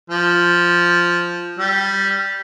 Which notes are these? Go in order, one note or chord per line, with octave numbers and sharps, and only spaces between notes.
F3
G3